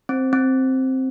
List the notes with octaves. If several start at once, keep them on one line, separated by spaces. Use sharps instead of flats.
C4
C4